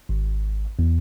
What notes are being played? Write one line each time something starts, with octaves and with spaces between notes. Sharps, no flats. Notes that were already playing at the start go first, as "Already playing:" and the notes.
G#1
E2